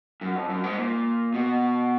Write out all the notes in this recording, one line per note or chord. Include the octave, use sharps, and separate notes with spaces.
F#2
F2
F#2
G#2
A#2
B2